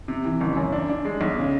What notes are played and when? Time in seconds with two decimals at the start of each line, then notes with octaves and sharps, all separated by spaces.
0.08 C3
0.25 E3
0.41 F#1
0.56 F#2
0.73 D4
0.89 D4
1.05 G#3
1.21 B1
1.37 C#3